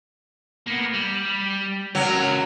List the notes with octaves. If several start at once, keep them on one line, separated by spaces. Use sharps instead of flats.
A#3 B3
G3
C#2 F#3 A#4